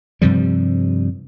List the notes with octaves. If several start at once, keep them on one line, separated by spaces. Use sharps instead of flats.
G2 C3 F3 G3